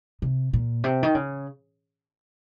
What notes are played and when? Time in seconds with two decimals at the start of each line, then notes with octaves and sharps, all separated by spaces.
0.22 C3
0.53 A#2
0.84 C3
1.03 D#3
1.15 C#3